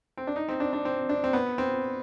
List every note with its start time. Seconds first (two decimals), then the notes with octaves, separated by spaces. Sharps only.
0.17 C4
0.27 D4
0.36 D#4
0.49 C4
0.60 D4
0.73 D4
0.85 C4
1.09 D4
1.24 C4
1.33 B3
1.58 C4